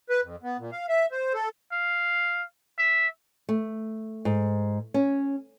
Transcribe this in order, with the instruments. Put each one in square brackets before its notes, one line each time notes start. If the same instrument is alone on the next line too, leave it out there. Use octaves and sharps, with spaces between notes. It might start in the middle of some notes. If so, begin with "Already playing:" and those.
[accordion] B4
F2
B3
A#2
F5
E5
C5
A4
[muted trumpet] F5
E5
[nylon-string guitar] A3
G#2
C#4